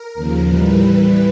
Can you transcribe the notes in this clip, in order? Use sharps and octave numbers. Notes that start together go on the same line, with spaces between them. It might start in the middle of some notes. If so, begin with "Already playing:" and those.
Already playing: A#4
D#2 C#3 F3
A2 E3 G3 B4